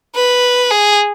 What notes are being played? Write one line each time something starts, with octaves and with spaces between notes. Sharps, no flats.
B4
G#4